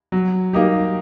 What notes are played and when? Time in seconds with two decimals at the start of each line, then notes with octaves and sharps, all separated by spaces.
0.12 F#3
0.53 A#3 D#4 G4